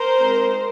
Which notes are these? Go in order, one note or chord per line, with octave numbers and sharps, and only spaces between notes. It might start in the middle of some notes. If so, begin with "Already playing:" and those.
Already playing: A#4 C5
G#3 C4 D#4